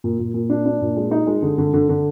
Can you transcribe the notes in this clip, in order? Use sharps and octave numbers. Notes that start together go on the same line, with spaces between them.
A#2
A#2
A#2
D4
D4
A#2
G#3
D#4
G#3
D3
D3
D3
D3